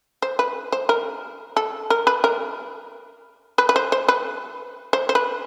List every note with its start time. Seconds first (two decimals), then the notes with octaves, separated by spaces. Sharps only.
0.22 C5
0.39 B4
0.72 C5
0.89 A#4
1.57 A4
1.90 A#4
2.07 B4
2.24 A#4
3.58 B4
3.69 B4
3.76 C5
3.92 C5
4.08 B4
4.93 C5
5.09 C5
5.15 B4